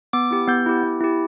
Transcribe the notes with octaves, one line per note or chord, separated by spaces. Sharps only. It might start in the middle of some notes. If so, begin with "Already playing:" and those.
B3 D6
E4 G4
B3 G6
E4 G4
B3
E4 G4